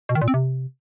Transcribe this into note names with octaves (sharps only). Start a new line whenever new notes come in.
B2
D#3
A#2
C4
C3